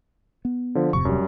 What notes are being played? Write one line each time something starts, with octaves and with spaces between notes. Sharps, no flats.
B3
D3 F3
D1 F2 C3 C#6
F#2 G3